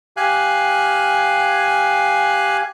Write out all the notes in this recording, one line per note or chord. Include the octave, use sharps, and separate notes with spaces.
G4 F5 G#5 F#6